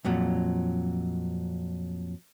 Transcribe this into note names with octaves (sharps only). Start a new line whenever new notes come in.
F2 A#2 F#3